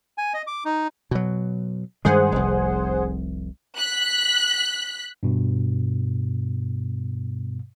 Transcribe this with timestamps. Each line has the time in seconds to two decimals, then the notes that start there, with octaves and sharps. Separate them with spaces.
0.18 G#5
0.34 D#5
0.47 D6
0.65 D#4
1.11 B2 F#3
2.05 G2 D#3 G#3 G#4 C5 F#5
2.32 F1 C2
3.77 F#6 B6
5.23 G2 B2